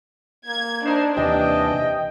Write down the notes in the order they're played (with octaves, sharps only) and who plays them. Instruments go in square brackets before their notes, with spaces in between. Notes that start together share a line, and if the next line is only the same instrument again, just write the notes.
[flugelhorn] A#3 [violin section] G#6
[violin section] D4 [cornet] D#4 [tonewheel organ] C5
[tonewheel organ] D#2 C3 E3 [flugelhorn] D#5 [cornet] G5